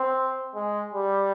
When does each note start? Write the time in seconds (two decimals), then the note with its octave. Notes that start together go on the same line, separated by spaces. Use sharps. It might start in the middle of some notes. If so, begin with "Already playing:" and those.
Already playing: C4
0.55 G#3
0.94 G3